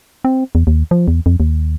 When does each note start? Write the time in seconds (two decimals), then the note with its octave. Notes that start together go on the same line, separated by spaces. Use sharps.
0.24 C4
0.55 E2
0.67 D#2
0.91 F3
1.08 E2
1.26 F2
1.40 D#2